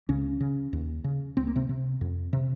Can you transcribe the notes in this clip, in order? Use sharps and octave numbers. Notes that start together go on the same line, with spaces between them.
C#2 C#3 C#4
C#3
D#2
C#3
C#2 C4
A#3
C3 C4
C3
F2
C3